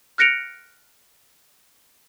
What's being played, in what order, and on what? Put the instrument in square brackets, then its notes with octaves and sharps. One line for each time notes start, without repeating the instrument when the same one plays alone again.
[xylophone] F6 F#6 A#6 C#7 D7 F7